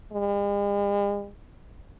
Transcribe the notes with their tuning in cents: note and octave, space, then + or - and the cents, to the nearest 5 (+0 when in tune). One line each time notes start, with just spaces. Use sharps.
G#3 -45